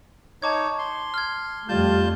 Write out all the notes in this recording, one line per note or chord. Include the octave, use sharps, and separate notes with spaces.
D#4 C#5 A5 D6 G#6
C6
F6 G#6
F2 G3 A3 F4 A5 G6